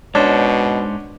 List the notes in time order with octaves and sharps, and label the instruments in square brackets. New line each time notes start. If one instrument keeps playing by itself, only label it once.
[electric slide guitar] G#2 C5 [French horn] B2 [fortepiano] C#4 D4